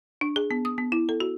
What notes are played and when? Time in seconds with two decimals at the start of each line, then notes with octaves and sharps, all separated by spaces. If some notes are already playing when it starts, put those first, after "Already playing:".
0.21 D4
0.36 G#4
0.51 B3
0.65 D#6
0.78 B3
0.92 E4
1.09 A4
1.20 F#4